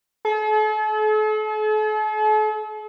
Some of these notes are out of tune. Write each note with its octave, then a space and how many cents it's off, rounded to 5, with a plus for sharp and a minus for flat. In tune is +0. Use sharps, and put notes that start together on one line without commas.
A4 -45